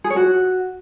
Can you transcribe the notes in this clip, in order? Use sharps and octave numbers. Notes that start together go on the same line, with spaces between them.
G#4
C#5
F#4